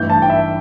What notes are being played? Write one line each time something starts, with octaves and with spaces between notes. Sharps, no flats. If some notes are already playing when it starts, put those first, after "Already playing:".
Already playing: A1 G2 E3 G6
A5
G5
E5